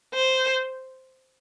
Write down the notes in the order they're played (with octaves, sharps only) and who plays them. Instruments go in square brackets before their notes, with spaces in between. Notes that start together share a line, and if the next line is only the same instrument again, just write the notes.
[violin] C5